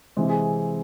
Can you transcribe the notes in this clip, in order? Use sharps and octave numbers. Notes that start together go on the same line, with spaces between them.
C3 E3 G#3 C4 G#4
G#4